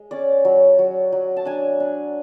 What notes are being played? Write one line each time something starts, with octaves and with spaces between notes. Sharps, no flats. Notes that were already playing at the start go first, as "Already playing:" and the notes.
Already playing: G#3
C#4 D5
F#3
F#3
F#3
A5
D4 G#5
D4